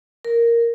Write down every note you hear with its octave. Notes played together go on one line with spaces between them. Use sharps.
A#4